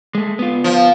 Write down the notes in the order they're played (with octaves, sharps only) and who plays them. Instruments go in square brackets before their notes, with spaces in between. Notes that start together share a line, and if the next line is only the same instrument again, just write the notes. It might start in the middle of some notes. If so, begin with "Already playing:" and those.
[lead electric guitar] G#3 A3
B3 F4
[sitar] F3